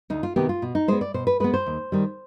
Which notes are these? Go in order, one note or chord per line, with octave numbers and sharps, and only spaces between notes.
D2 D#4
F4
C3 D#3 B3 G4
F4
B2
D#4
G#3 B3 C5
D5
B2 C5
B4
G#3 B3 B4
C5
D#2
D#3 G3